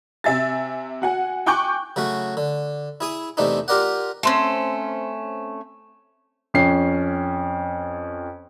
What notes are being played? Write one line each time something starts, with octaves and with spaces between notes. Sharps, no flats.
C3 E5 G#5 A6
F#4 F#5 G#5
G5 G#5 C#6 D6 F#6 G6
C#3 F#3 A3 F#4
D3
E4 G#4 D#6
E2 C3 A3 D4 D#4
F4 G4 A#4 D5 F#5
A3 C4 C#4
F2 C#4 C7